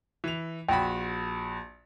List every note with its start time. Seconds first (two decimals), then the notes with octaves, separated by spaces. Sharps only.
0.24 E3 F7
0.69 A#1 F#4 G5 B5